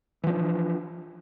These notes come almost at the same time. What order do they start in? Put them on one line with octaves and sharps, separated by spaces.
E3 F3 C#4 D4